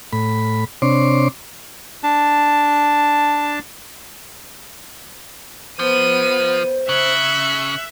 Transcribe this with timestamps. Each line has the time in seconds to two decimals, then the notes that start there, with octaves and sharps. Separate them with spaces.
0.13 A2 B5
0.82 C3 C4 D4 C#5 C6 D6
2.03 D4 A5
5.79 F3 B3 C5 D#7
6.89 C#3 E5 F#6 C#7